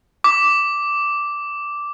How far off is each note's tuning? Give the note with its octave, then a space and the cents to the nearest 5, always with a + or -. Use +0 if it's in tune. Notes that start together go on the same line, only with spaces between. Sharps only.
D6 -5